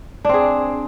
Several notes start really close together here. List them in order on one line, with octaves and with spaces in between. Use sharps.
D4 C4 G#4